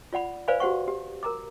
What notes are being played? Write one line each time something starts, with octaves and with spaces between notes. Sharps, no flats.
F4 D5 F#5 B5
B4 C5 D5 F5 G#5 B5
F#4 G4 C5 F#5 C#6
G4
A#4 A#5 D6